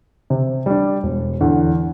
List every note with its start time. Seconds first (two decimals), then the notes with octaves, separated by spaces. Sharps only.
0.30 C3
0.66 G3 D4
1.03 E1
1.41 E2 D3